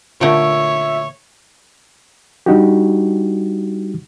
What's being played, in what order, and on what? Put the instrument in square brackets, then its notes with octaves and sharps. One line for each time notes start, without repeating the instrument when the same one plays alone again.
[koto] A#2 D3 A3 [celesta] F4 D7 [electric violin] C#5 [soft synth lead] E5
[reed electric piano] G3 D4 D#4 F#4 G4